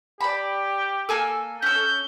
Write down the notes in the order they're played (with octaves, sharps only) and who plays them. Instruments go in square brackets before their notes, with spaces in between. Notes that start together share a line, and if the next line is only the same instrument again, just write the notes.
[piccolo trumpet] G4 [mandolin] D5 B5
[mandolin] A#3 G#5 E6 [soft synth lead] A4
[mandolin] C#4 E6 [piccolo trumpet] G6